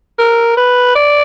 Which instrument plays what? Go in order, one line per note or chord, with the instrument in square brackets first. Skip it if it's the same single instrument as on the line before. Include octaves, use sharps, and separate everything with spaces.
[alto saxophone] A#4
B4
D5